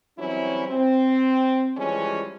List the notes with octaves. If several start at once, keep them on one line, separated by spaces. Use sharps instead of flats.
E3 F#3 G3 C4 C#4 E4
C4
E3 F3 G3 G#3 C#4